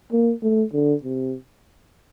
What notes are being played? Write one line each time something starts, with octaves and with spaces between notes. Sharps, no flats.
A#3
A3
D3
C3